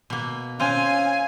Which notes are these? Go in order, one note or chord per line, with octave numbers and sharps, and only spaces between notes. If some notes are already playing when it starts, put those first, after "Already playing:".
B2 A#3
C4 C#4 F4 F5 G#5